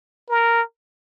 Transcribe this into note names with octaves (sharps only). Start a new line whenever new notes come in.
A#4